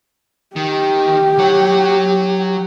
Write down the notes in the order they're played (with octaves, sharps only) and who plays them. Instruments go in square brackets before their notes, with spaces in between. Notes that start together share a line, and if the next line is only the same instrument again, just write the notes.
[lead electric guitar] D#3 [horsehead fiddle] G4
[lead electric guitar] F#3 C#5